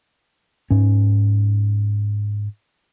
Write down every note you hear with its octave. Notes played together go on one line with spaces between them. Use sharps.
G#2 C#4